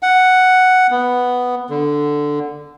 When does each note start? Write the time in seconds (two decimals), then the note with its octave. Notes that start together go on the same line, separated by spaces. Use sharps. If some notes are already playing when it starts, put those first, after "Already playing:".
0.03 F#5
0.91 B3
1.70 D3